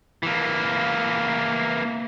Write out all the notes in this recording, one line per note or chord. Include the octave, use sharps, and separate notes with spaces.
E3 A#3